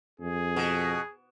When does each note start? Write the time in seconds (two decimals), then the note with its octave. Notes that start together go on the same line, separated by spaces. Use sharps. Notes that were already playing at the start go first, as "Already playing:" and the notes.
0.20 F2 G#4
0.56 B2